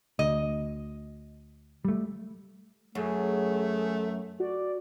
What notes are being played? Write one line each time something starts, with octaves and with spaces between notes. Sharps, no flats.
D2 D#5
G3 A3
F#2 A3 G#4
F#4 D5